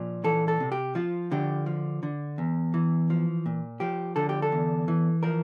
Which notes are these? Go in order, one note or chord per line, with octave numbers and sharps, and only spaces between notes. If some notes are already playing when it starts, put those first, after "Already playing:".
Already playing: A#2 F3
E3 A4
A4
C3
G4
F3 F4
D3 G4
F3
D3
E2
E3
F3
A#2
F3 G4
D3 A4
G4
A4
E2
E3
F3 A#4